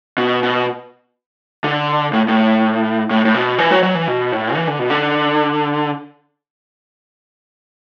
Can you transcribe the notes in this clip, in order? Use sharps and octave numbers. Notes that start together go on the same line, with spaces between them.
B2
B2
D3
A2
A2
A2
A2
B2
E3
F#3
F#3
E3
B2
A2
E3
D3
B2
D3